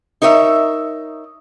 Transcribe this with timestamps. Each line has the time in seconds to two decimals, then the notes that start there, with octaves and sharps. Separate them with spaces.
0.22 D#4 A#4 C#5 D#5 E5